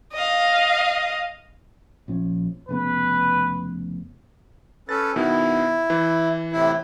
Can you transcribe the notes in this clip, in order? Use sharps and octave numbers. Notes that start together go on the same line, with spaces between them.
D#5 F5
A#1 F3 C#4
F1 C#3 B3 B4
C#4 A4 B4 A6
B2 D#3 B3 E4
E3
A2 C3 E4